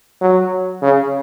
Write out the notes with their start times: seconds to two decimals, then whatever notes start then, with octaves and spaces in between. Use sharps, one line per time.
0.21 F#3
0.82 C#3